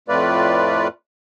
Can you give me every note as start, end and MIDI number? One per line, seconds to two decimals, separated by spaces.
0.08 0.88 41
0.08 0.88 45
0.08 0.88 57
0.08 0.88 65
0.08 0.88 71
0.08 0.88 74